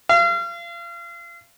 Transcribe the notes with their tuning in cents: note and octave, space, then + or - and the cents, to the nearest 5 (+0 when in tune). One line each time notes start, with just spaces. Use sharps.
F5 -35